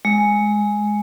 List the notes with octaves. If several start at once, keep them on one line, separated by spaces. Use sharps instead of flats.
G#3